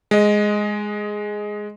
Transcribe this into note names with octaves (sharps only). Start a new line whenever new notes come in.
G#3 D#5